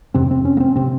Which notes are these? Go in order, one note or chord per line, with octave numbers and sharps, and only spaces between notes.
F2 C3 C4
C4
C#4
A#3
C4
C3 C4